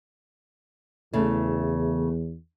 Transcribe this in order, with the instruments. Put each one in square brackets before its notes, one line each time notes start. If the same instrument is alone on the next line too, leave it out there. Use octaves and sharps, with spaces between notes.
[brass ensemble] E2 [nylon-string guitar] C#3 A3